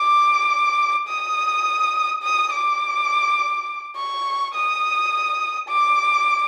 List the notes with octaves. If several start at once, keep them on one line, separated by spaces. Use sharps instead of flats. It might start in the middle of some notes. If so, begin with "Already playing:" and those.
Already playing: D6
D#6
D#6
D6
C#6
D#6
D6